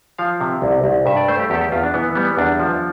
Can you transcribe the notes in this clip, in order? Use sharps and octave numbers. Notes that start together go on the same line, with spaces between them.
F3 F5
C3
C2
C2
G2 E5
D5
A3 C5
G4
E2 G4
A4
G4
E2 F4
D4
E3 B3
G3 B3
E2 D4
F3